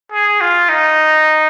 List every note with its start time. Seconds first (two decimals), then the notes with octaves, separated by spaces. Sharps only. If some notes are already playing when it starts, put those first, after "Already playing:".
0.12 G#4
0.41 F4
0.69 D#4